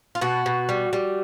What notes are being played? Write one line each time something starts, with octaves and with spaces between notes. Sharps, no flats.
F4
B2 F#4
B2
G3
G3